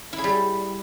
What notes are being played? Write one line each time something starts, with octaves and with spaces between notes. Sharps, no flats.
E4
G#4
G3